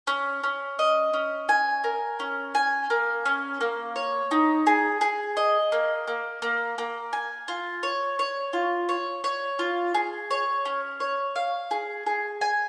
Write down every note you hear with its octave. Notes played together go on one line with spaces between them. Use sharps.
C#4
C#4
D#5
C#4
G#5
A#4
C#4
G#5
A#3
C#4
A#3
C#5
D#4
G#4
G#4
D#5
A#3
A#3
A#3
A#3
G#5
F4
C#5
C#5
F4
C#5
C#5
F4
G#4
C#5
C#4
C#5
F5
G#4
G#4
G#5